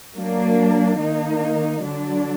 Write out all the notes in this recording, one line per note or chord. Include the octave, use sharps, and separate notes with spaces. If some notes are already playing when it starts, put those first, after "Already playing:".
F#3 A#3 D4
D#3 A#3 D#4
D3 F#3 D4